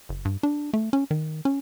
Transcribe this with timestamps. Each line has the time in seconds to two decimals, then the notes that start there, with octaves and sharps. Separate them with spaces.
0.09 F#1
0.25 G2
0.43 D4
0.74 A3
0.93 C#4
1.11 D#3
1.45 C#4